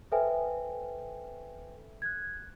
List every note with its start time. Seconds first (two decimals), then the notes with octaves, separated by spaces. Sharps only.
0.12 A4 B4 C5 E5 G5 G#5
2.02 F#6 G#6